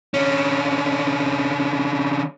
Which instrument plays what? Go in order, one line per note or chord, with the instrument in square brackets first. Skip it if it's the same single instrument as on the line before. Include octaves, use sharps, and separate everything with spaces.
[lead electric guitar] D3 C#4